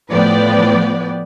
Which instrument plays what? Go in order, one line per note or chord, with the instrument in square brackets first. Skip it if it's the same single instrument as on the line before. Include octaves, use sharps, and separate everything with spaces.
[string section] A2 F3 B3 B4 D5 G5